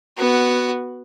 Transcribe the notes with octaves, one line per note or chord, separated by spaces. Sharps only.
B3 F#4